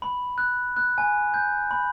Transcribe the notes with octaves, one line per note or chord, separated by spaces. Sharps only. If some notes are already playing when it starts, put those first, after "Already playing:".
B5
F#6
F#6
G#5
G6
B5